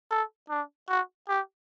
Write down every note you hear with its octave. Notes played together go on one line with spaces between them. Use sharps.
A4
D4
F#4
G4